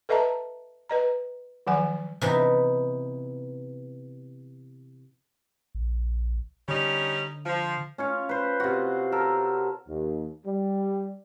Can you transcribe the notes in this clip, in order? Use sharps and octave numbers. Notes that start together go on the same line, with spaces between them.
A4 B4 D#5 E5 A5 A#5
B4 D#5 A#5
D#3 F3 F#3 F#5 G#5
C3 E3 B3 D#4
A#1
D3 G3 C#4 D#4
F3
C#4 F4 C#5
B4 C5
C3 F4 F#4
A4 A#4 E5
D#2
G3